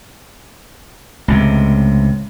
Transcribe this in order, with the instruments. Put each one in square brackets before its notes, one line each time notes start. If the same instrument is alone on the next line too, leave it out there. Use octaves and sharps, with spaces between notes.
[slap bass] C#2 A2 C3